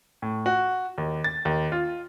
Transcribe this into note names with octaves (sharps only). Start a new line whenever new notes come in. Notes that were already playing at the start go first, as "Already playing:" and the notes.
A2
F#4
D#2
A6
D#2
F4